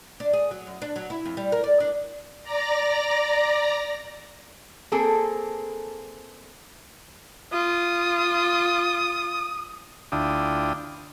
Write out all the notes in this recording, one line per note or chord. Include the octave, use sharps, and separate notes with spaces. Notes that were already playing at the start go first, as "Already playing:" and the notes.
D4
G#4
F#3
F#2
D4
F#3
E4
F2
G3
A#4
D5
D4
D5 A#5 A#6
A#3 C4 G#4 A4
F4 D#6
D2 D4 E4 F4 G5 D#6